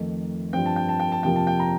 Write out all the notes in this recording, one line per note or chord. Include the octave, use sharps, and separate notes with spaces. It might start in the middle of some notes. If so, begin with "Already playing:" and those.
Already playing: F2 D#3 A3 D#4
G2 F3 C4 G5
A5
G5
A5
G5
A5
F2 C3 F3 A#3 G5
A5
G5
A#5